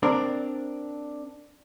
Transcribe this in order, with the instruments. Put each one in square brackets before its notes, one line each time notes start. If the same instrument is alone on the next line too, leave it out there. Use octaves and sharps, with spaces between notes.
[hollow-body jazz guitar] C4 D4 A#4